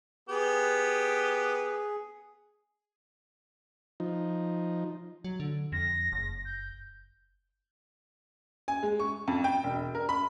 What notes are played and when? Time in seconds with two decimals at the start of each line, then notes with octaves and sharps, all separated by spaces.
0.29 B3 G4 G#4
4.00 F3 D#4
5.24 F#3
5.40 D3
5.72 F2 A#6
6.12 F#1
6.45 G6
8.68 G#5
8.83 G#3
9.00 C#6
9.28 F2
9.44 G5
9.64 E1
9.95 A#4
10.09 B5